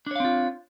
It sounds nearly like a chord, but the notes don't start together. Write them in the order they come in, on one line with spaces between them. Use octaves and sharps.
D4 C#5 F5 C4 F4